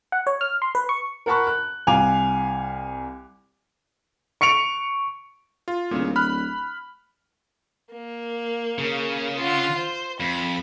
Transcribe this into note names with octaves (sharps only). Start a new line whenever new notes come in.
F#5
C#5
F6
C6
B4
C#6
A#4 F#5 A5 B5 C#6 F#6
F#6
C2 F5 G#5 D6 F7
C#6 C#7 D7 F7
F4
D1 A#2 C#3
B5 F6 F#6
A#3
C#3
F4 F#5
C5
F2 B5